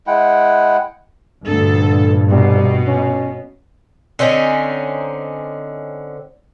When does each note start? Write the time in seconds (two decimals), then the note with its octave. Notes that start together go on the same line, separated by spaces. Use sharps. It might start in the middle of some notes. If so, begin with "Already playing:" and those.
0.07 G#3 E4 F#5 G5
1.45 D2 G2 A#2 D3 A4
2.30 B2 G3
2.88 C#4
4.19 D3 C4 C#4 D#4